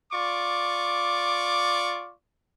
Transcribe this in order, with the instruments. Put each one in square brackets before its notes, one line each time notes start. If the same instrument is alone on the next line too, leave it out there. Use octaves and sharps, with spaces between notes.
[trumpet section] F4 D5 C#6 D6